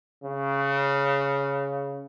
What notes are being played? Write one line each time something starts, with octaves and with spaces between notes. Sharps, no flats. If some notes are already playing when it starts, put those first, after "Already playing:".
C#3